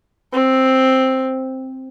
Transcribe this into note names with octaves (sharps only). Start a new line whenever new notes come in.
C4